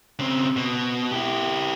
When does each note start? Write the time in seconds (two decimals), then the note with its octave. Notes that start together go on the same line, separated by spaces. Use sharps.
0.19 C#3 C4
0.56 B2
1.11 E4 G4